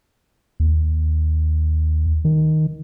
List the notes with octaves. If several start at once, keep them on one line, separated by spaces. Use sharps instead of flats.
D#2
D#3